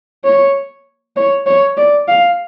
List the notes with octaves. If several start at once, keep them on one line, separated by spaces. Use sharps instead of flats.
C#5
C#5
C#5
D5
F5